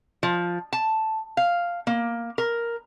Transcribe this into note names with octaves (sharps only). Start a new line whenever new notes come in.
F3
A5
F5
A#3
A#4